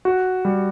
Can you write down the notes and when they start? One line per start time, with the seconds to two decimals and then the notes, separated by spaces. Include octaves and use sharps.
0.05 F#4
0.45 G3